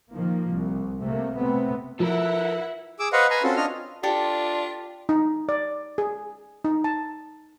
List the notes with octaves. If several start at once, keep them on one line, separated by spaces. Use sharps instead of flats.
D#3 F3 A#3
C2
C3 A3 A#3
C3 A3 B3 C4
F3 E4 A4 A#4 E5 F#5
G#4 D6 E6
B4 C5 D#5 F5 F#5 C#6
B4 G#5 A#5 C6
C4 C#4 F4 F#4 A4
D4 F4 C#5 D#5 F6
D4 F4 G4 A4
D#4
D5
G#4
D#4
A5